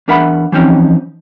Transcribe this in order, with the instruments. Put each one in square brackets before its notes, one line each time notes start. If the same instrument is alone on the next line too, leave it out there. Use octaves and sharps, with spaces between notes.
[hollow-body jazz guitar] E2 D4 A#4 E5 F#5 B5
E3 F3 C4 C#4 D#4